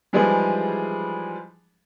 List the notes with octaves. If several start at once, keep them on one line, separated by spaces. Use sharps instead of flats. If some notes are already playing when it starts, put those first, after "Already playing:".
E3 F3 G3 G#3 D#4 G#4